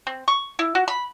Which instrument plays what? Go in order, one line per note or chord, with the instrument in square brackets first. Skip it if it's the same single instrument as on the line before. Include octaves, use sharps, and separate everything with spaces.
[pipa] C4
C#6
E4
F#4
B5